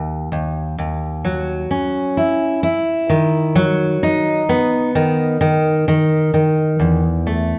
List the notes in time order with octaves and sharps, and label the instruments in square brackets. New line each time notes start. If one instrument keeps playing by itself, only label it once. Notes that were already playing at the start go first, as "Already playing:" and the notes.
Already playing: [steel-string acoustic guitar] D#2
D#2
D#2
F#3
C#4
E4
E4
D#3
F#3
D#4
B3
D#3
D#3
D#3
D#3
E2
A3